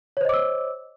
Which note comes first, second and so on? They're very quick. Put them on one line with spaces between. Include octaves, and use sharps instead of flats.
C#5 C5 D#5 D6 E6